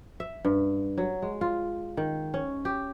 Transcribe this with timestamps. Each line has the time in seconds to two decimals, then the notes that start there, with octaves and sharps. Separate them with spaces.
0.20 E5
0.45 G2
0.98 F#3
1.22 G#3
1.41 F4
1.97 D#3
2.34 C#4
2.65 G4